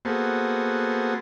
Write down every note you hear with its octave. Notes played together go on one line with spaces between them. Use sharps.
A#3 B3 F#4 G#4 A4 C5